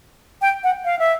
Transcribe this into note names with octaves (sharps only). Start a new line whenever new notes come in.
G5
F#5
F5
E5